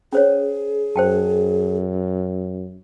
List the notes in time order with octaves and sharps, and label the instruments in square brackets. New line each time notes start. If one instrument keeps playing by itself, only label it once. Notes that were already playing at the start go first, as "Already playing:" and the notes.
[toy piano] C#4 C5 C#5 [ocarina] G#4
[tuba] F#2 [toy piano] C5 G5 A5